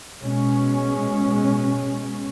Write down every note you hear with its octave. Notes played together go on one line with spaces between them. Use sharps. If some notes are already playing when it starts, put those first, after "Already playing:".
B2 G#3 C#4